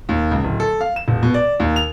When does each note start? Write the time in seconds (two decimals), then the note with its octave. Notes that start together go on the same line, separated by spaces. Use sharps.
0.09 D#2
0.31 C#2
0.44 D1
0.60 A4
0.81 F5
0.96 E7
1.08 E1
1.23 B2
1.34 D5
1.60 D#2
1.76 F7